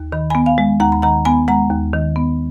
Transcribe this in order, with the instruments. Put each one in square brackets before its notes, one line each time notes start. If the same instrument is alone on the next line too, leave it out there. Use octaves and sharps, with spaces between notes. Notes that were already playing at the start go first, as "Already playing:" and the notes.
Already playing: [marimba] D#2
D#3 B5
B3 G#5 B5
F5 G#5
G#3
D#2 F#5 A#5
B5
D#3 F#5 A#5
B3 G#5 B5
G#3 F#5 A#5
D#2
D#3
B3